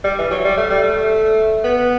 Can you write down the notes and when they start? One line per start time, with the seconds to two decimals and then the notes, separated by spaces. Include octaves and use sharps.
0.04 G3
0.18 E3
0.31 F#3
0.44 G3
0.57 A3
0.70 G3
0.82 A3
1.64 B3